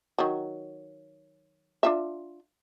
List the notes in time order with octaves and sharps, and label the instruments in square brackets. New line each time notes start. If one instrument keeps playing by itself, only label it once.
[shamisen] D#3 F#3
D4 F4 E5